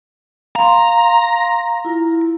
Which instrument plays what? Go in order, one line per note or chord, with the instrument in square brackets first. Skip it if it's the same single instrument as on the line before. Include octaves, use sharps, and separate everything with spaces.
[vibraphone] F5 C6 [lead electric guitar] A#5
[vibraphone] E4 F4